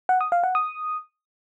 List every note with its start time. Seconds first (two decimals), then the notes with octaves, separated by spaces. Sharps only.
0.09 F#5
0.21 D#6
0.32 F5
0.44 F#5
0.55 D#6